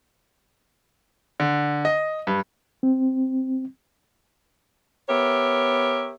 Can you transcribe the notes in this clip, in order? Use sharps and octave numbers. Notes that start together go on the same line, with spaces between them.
D3
D#5
G2
C4
B3 G4 A#4 C#5 E5